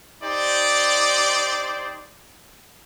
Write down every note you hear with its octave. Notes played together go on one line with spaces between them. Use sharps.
D#4 G4 C5 D5